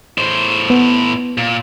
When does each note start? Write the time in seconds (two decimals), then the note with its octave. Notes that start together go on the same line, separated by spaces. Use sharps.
0.18 A2 C5
0.70 B3
1.38 A#2